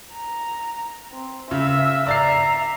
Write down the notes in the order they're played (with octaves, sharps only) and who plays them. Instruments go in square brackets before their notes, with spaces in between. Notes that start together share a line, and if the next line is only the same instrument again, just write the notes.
[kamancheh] A#5
C4
[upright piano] C#3 [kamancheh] E5 E6
[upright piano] D5 A6 C7 [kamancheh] E5 A#5